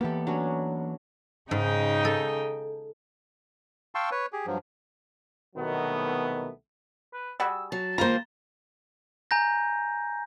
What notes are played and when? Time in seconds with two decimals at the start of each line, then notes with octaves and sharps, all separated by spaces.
0.01 E3 A#3 B3 G4 A4
0.27 F#3 C#4 D4
1.51 G#2 C#3 D#4 G5
2.05 A4
3.95 F5 G5 A5 C6 C#6 E6
4.11 B4 C#5
4.33 G4 G#4
4.46 G2 F3 F#3
5.56 C2 B2 D#3 F#3 A3 B3
7.13 B4
7.40 G3 F#4 G#4 E6
7.72 F#3 A5
7.98 D#3 G#3 A#3 F4 C5 A#5
9.31 G#5 A#5 G6 A#6